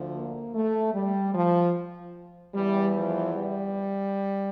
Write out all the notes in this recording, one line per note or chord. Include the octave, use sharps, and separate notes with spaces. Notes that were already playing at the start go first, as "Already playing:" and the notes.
Already playing: D2 D3 F3
A#3
A3
G3
F3
E2 E3 G3
F3
G3